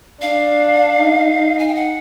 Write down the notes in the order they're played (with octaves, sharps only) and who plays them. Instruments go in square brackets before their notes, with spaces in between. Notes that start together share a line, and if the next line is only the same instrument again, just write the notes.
[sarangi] D4 [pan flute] F5
[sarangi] D#4
[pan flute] G#5
G5
F#5